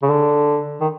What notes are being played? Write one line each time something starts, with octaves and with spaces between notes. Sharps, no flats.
C#3
D3
D#3